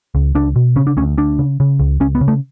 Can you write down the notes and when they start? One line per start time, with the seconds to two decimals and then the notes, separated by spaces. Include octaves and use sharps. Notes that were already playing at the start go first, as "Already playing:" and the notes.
0.15 C#2
0.35 C#2 D4
0.56 B2
0.76 C#3 C#4
0.87 D4
0.97 D2 C#4
1.18 D2 D4
1.39 C#3
1.60 C#3
1.80 C#2
2.00 C#2 C#4
2.15 B3
2.21 C#3
2.28 A3